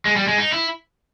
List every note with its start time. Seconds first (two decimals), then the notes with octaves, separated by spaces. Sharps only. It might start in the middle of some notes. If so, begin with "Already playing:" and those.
0.05 G#3
0.16 G3
0.27 G#3
0.38 D#4
0.52 E4